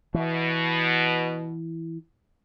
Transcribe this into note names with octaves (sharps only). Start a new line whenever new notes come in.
B2 E3